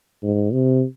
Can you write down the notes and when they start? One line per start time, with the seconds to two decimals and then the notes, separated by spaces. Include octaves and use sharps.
0.23 G#2
0.53 C3